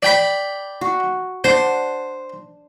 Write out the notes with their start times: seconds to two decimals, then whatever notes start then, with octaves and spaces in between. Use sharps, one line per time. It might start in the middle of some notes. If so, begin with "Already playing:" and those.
0.03 D5 G5 B5
0.81 F#4
1.44 D4 C5 F#5 C6